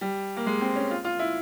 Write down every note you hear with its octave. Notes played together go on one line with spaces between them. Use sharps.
G3
A#3
G#3
C4
C#4
F4
F4
E4